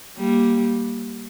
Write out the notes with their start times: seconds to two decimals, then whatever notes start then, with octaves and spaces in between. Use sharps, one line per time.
0.18 G3 A#3